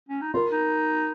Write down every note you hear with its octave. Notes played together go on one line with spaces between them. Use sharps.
C#4
D#4
F4 A#4
D#4